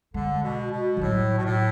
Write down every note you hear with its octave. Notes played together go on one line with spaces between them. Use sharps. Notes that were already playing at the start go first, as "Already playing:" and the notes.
D3 G#3
B2
B2
F3
A2 F#3
B2
A2